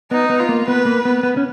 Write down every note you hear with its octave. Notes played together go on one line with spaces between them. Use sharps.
B3 D#4
B3
F4
A#3
B3 B4
A#3
B3
B3
C#4